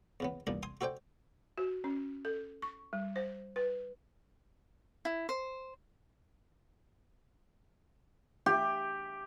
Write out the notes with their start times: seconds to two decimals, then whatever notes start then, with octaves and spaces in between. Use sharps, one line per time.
0.20 E2 C#3 B3
0.47 E2 G2 A#2 D4 D#4
0.63 G#5 C6 D#6
0.81 F#4 A4 C5 D5 G5
1.58 F#4
1.84 C#4
2.25 A4
2.62 C#6
2.93 G3
3.16 C5
3.56 B4
5.05 E4
5.29 C5
8.46 G4